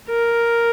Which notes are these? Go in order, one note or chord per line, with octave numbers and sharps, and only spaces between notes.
A#4